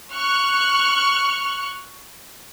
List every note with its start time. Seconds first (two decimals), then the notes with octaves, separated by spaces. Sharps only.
0.11 C#6 F6 F#6